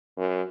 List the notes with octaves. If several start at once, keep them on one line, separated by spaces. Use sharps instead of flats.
F#2